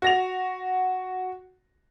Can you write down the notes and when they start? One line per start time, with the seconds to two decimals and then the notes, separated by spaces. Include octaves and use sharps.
0.02 F#4 A#6 F7